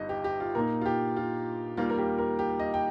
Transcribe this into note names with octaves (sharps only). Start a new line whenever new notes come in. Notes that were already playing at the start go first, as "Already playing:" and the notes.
Already playing: G1 G2 G3 D#4 D#5
G4
G4
F4
A#2 A#3 D#4 A#4
F4
G4
F4
D#2 D#3 G3 A#3 F4
A#4
G4
A#4
G4
D#5
G5